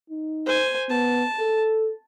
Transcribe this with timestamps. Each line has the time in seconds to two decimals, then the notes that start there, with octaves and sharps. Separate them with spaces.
0.10 D#4
0.46 C5 G#5
0.90 B3 A5
1.40 A4